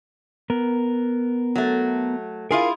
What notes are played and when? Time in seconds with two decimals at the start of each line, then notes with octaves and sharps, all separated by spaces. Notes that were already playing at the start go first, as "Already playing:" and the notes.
0.50 B3 A#4
1.56 F#3 A3
2.51 E4 F4 G#4 A#4 F5